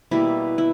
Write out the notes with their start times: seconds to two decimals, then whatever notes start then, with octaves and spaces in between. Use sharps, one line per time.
0.11 B2 G3 A#3 E4
0.58 E4